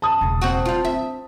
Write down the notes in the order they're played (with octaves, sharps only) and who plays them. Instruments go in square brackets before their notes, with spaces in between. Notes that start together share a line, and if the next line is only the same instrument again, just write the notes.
[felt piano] A5 D#6
[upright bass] E1 C#3
[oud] C4 F#4
G3 F4
[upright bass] C4 D4 [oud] E5